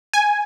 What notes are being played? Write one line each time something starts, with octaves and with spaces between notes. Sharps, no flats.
G#5